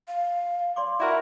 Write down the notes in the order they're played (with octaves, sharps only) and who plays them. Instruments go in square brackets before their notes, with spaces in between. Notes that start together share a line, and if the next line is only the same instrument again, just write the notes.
[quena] F5
[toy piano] D5 C6 D6
[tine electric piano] E4 F#4 A#4 [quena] E5